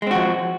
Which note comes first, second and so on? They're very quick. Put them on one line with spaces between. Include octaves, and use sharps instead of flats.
G#3 C4 F#4 F3